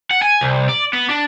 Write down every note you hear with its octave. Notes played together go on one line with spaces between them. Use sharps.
F#5
G#5
C2
D5
B3
D4